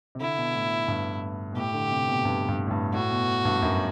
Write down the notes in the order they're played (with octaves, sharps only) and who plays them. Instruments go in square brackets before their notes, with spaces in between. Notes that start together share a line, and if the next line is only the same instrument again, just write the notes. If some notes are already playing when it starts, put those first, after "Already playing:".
[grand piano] C3
[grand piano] D3 [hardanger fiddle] E4
[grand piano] B2
A2
G2
B2
[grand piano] A2 [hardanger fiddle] G4
[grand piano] D3
C3
B2
G2
G2
A2
G2
[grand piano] A2 [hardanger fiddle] F#4
[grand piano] B2
G2
F#2